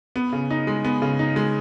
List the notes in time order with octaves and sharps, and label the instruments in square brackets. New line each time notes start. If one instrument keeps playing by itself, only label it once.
[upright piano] B3
C#3
D#4
G#3
B3
C#3
D#4
G#3